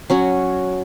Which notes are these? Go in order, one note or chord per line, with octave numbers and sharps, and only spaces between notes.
F#3 C#4 F#4